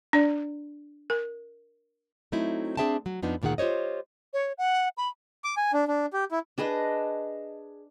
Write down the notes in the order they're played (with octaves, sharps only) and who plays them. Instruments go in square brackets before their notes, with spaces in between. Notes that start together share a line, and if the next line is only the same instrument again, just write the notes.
[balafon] D4 D5
A#4
[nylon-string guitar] F#3 A3 C4 D#4 E4
C4 D4 G#4 E5 G5 A5
F#3
F2 F3 B3 D4 D#4
D2 A#2 D#3 G#4 F#5
F4 G4 C5 C#5 D#5
[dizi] C#5
F#5
B5
[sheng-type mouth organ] D6
G#5
D4
D4
G4
E4
[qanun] D4 G#4 B4 D#5